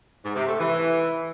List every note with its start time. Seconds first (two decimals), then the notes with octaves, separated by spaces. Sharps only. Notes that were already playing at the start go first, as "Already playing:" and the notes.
0.24 G#2
0.36 C3
0.47 A3
0.59 E3